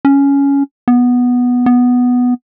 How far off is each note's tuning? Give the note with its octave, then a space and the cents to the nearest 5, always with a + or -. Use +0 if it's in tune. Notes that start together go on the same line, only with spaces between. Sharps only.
C#4 +10
B3 -5
B3 +0